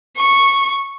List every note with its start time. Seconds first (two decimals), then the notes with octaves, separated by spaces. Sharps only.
0.17 C#6